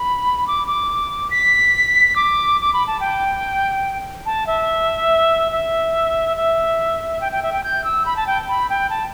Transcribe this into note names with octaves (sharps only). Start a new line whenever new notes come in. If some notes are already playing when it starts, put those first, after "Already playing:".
Already playing: B5
D6
D6
B6
D6
D6
B5
A5
G5
A5
E5
E5
E5
G5
G5
E5
G5
G6
E6
B5
A5
G5
B5
G5
A5